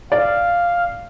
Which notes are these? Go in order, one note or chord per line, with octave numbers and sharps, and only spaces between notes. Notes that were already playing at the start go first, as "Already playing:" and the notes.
D5 F5